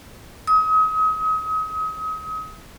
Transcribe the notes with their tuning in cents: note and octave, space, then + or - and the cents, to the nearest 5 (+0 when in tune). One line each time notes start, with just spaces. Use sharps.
D#6 +35